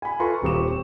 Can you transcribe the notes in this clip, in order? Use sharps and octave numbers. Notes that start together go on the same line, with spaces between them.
G#5 B5
F4 A4 B4 A#5 C6 C#6
D#1 C4 G4 C#6 D6 E7